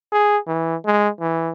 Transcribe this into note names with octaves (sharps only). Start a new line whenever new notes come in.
G#4
E3
G#3
E3